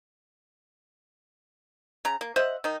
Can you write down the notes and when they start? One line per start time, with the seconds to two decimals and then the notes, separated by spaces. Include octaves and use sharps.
2.05 C#3 A#5
2.21 A#3
2.36 C5 D#5 E5 F#5
2.64 D#3 D#4